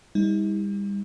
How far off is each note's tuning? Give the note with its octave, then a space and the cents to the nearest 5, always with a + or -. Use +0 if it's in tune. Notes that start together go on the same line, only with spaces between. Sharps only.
G3 +35 D#4 +45